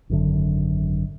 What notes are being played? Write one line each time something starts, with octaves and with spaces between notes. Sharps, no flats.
G#1 F#2 D3